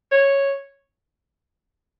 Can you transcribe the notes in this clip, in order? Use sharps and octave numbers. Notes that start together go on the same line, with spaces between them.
C#5